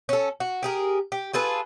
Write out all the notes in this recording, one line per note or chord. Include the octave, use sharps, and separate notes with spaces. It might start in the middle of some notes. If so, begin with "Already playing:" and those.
C#4 A4
F#4
G4 G#4 A#4
G4
F4 G#4 A4 B4